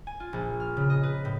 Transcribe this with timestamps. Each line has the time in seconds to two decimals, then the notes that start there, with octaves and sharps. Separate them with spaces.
0.07 G#5
0.20 F4
0.33 A#1
0.60 F6
0.77 C#3
0.90 D#5
1.03 B4
1.25 A2